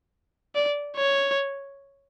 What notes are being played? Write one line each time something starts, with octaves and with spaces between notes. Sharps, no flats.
D5
C#5